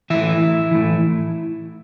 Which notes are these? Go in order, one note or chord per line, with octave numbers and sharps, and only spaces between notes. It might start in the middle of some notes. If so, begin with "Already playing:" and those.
A2 E3 E4 E5
A2 E3